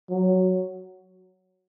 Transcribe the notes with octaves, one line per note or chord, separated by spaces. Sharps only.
F#3